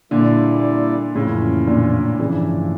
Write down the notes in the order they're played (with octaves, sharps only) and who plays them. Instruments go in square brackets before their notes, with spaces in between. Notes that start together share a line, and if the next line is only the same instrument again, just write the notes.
[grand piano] A#2 D3 [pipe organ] G3 A#3 E4 A4 D5
[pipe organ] F2 E3 A#3 C#4 F4 [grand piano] A2 C#3
[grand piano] A#2 D3
[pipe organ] G2 F3 A3 D4 [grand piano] C#3 E3